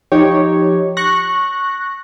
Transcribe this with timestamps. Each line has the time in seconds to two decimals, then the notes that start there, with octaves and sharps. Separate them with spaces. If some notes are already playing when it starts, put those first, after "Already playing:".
0.12 F3 D#4 G4 C#5
0.97 C#6 F#6 A#6